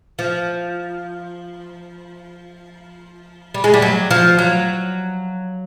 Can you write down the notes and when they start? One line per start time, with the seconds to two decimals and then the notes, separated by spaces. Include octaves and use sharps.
0.19 F3
3.54 G3
3.64 G#3
3.74 G3
3.82 F#3
4.11 F3
4.39 F#3